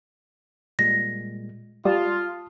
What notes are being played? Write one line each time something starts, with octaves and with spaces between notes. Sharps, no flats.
A#2 G3 G#3 A#6
G3 F4 A5 D#6